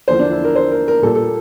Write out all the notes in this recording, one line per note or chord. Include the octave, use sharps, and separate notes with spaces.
E2 D3 F3 A#3 C5
D4
E4
A#4
C5
A#4
A#4
A#2 G3 A#3 A4
A4